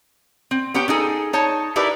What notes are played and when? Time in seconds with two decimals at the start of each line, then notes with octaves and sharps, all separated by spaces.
0.51 C4
0.74 B3 C#4 G4 G5
0.88 D3 D#4 G#4 A4
1.33 D#4 C#5 A5
1.76 D#4 E4 G4 A#4 B4 D5